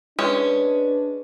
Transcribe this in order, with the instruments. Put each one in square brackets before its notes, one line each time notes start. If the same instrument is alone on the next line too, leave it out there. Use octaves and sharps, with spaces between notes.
[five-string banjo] G#3 C#4 [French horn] D4 [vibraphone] B4